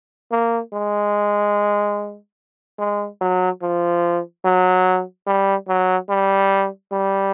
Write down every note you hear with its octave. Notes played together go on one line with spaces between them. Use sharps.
A#3
G#3
G#3
F#3
F3
F#3
G3
F#3
G3
G3